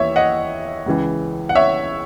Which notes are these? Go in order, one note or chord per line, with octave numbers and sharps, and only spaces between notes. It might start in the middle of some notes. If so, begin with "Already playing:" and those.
Already playing: D#2 E3 C#5 E5
D#5 F#5
C#2 C#3 E3
F#5
C#5 E5